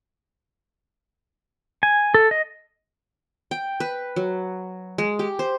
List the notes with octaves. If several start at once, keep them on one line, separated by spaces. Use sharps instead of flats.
G#5
A4
D#5
G5
B4
F#3
G#3
G4
C5